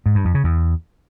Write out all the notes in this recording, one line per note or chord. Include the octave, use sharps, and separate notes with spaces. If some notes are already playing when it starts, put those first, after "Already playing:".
G#2
G2
F2
C#3
E2